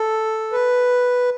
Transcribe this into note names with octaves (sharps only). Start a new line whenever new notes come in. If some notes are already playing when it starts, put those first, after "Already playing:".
Already playing: A4
B4